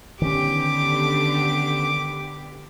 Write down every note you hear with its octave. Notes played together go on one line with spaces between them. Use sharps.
D3 D#3 B3 C#4 G4 D6